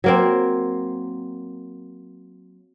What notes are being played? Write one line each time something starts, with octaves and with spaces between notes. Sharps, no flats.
F#3 A#3 C4